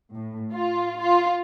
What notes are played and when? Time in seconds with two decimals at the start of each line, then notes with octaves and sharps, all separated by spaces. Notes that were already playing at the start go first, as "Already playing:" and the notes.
0.14 A2
0.53 F4
1.00 F4